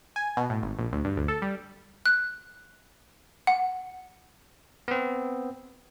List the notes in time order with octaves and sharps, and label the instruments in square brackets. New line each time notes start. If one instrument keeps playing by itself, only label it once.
[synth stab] G#5
B2
A2
G#1
A#1
D2
G2
D2
A4
G3
[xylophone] F#6
F#5
[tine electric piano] B3 C4